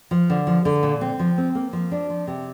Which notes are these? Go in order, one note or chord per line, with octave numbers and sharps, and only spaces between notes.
F3
D3
F3
D3
A#2
C4
F3
C4
A#3
F3
D4
F3
C3